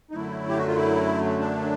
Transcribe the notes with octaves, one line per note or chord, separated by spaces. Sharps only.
D#4
F#2 D3 F#3 A3 E4
G4
F#4
F4
E4
D4